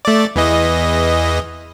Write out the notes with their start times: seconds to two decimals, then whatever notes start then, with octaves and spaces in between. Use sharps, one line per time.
0.05 A3 D5
0.36 E2 E3 D#5